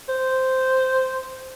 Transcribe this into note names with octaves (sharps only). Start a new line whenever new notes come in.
C5